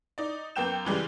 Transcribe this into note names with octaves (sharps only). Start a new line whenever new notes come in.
D#4 D5
F#2 A#3 B3 G5 G6 E7
C#3 E3 G3 G#3